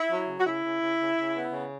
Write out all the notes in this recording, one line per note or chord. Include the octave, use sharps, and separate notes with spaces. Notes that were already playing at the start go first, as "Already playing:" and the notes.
Already playing: E4
F#3
C#3
F#4
C#3 E4
C#3
C#3
C#3
C#3
B3
C#3